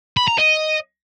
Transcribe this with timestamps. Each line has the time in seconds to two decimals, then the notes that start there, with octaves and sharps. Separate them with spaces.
0.17 B5
0.28 A#5
0.38 D#5